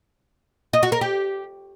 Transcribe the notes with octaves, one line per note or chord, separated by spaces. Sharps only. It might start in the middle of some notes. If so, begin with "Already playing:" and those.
D#5
F#4
A#4
G4